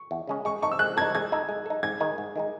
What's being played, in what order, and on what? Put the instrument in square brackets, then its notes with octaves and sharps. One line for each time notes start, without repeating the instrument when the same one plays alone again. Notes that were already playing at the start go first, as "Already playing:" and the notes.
Already playing: [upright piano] C#6
[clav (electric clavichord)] E2
C#3 G#3 C#4
[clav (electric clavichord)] G#3 [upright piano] C#6
[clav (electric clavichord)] D#4 A4 [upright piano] C#6
[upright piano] E6
[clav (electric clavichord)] G#3 [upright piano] F#6
[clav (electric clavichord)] D#4 A4 [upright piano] G#6
[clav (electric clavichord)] G#3 [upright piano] G#6
[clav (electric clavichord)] D#4 A4
G#3
D#4 A4
[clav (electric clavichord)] G#2 [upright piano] G#6
[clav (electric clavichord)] D#3 G#3 D#4
G#2
D#3 G#3 D#4